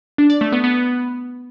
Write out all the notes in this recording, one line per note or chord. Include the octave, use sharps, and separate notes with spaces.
D4
D5
A3
B3
B3